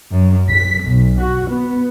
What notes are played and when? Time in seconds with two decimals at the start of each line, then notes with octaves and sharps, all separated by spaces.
0.12 F#2
0.50 B6
0.88 B1
1.20 F#4
1.49 B3